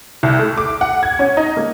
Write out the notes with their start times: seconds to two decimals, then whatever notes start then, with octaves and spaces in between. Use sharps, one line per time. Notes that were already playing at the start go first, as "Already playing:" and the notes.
0.23 C2
0.39 A3
0.58 D6
0.81 F#5
1.03 G#6
1.19 C#4
1.37 D#4
1.57 A#3